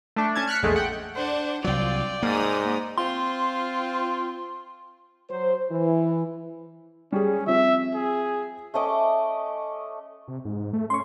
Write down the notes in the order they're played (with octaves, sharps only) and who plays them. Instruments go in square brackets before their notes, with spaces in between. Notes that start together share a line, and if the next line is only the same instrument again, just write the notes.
[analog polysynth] A3 D4
C#4 A5 G#6
F6 F#6 B6 C#7
A#1 E2 G#3 A3
F#5 G5
[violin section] D4 F#5 [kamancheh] C5
[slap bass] C2 F#3 [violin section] F4 [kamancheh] D5 G5
[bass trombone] G#2 [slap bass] A#3 [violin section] A#5 D#6
[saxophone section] C4 F4 [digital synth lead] C6
[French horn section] F#3 C5
E3
[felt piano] G3 G#4 [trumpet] C#4
[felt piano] F3 C4 [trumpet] E5
[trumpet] G#4
[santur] A3 C#4 D#5 D6
[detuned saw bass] C3
G#2
A3
[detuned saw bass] C#4 [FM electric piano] C6 C#6